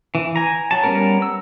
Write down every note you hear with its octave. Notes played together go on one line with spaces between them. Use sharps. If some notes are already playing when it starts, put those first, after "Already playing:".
E3
G#5 A#5
F#3 A5
G3 A#3 B3 C#4 A#4
E6